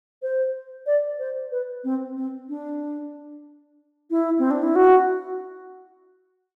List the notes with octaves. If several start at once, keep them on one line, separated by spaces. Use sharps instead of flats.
C5
D5
C5
B4
C4
C4
D4
E4
C4
D4
E4
F#4